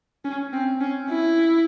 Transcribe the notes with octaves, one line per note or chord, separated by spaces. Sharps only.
C#4
C4
C#4
E4